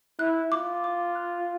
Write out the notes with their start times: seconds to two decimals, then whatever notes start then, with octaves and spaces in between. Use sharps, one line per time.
0.19 E4 F#6
0.52 F4 D6
0.84 D6
1.15 F#6